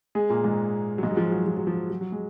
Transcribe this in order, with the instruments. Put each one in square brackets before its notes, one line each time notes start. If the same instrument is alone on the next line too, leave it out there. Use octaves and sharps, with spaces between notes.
[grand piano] G#3 G#4
A#2 A#3
G#2 G#3
F#3
G#2 G#3
F#3
F3
F#3
F3
F#3
F3
F#3
F#3
G#3